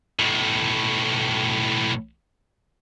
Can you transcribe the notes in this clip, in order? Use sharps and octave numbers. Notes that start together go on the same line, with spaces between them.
B1 A2